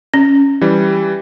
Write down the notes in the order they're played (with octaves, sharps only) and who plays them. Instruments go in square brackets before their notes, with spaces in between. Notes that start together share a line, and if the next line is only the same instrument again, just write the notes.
[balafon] C#4
[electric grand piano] E3 G3